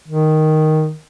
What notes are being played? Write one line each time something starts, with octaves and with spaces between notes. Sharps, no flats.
D#3